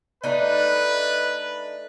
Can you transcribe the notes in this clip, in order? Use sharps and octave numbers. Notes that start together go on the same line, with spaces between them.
A3 D4 D#4 B4